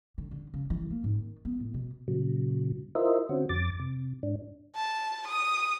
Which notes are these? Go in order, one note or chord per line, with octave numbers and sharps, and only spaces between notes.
D3
D3
C#3
E3
A#3
G#2
D#3
B3
A2
B2
A#2 C#3 F#3
E4 F4 A#4 C5 D#5 E5
D3 C4 C#4 F#4
F2 D6 A6
C3
G#2 D4
A5
D#6